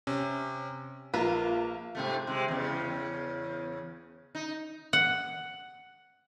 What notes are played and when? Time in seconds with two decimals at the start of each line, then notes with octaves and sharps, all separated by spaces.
0.07 C3 C#4
1.14 A#1 A#3 F4 A#4 B4
1.95 G#2 C3 A3
2.27 C3 G#3
2.48 E2 C#3
4.35 D#4
4.93 F#5